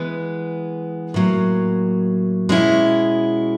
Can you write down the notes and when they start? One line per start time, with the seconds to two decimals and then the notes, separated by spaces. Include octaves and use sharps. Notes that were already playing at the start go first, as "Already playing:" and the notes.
Already playing: E3 G#3 B3
1.14 A2 F#3 A#3
2.49 B2 G#3 C#4 E4